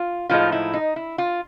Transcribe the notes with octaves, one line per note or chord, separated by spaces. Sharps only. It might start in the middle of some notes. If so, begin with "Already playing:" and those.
Already playing: F4
A2 F3 G#3 B3 D#4 F4
E4
D#4
E4
F4